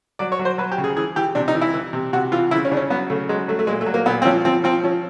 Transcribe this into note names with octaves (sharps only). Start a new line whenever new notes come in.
F#3 D5
C#5
F#3
C5
F#3 B4
G4
C#3
G#4
E3 G#4
E3 G4
C3 D4
D#4
E3
E4
E3
C3
C3 F#4
E3 F4
C#3 E4
C#4
C#3 D4
C#4
F#3 B3
C#3 A3
F#3 G#3
F#3 A3
A3
A#2 G#3
A3
F#3
A#3
A#2 B3
C4
F3 C#4
F3 C4
F3 C4
F3 C#4